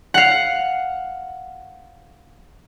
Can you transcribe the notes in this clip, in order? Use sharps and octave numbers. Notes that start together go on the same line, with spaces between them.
F5 F#5